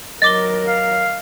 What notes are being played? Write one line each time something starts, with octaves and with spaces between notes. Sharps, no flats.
F#3 A#4 D#5 D6 A6 G7
F5